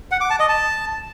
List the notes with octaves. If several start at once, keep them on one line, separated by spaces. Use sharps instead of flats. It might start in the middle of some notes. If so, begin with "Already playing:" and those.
F#5
D6
A5
D#5
A5